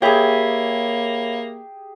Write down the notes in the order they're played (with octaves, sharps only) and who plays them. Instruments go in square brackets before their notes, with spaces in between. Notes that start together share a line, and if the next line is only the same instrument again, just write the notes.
[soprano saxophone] A#3 [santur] G4 G#4 [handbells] C#5 E5 B5